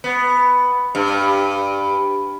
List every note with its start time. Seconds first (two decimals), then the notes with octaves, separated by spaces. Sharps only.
0.04 B3
0.95 G2